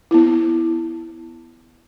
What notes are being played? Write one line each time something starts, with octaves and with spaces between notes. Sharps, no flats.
B3 E4